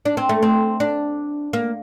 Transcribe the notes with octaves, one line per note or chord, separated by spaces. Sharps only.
D4
C4
A3
C4
D4
A#3